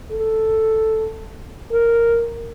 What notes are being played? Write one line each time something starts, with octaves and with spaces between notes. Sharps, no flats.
A4
A#4